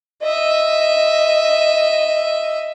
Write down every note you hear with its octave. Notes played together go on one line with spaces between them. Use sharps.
D#5 E5